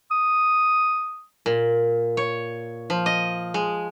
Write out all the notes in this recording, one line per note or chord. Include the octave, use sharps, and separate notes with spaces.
D#6
A#2
C#5
F3
D#5
G#3